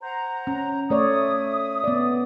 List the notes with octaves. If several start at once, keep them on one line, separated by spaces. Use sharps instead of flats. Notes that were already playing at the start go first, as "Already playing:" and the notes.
C5 F#5 A#5
C#4
A3 C#5 D5 E5 D#6
B3 D5